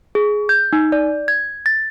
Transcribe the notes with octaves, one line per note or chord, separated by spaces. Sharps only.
G#4
G6
D#4
D5
G#6
A6